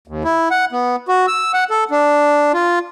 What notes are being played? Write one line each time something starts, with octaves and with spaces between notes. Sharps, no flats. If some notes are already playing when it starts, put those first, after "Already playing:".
D#2
E4
F#5
B3
F#4
E6
F#5
A4
D4
F4